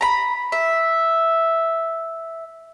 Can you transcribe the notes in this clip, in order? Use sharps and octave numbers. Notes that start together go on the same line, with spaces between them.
A#5 B5
E5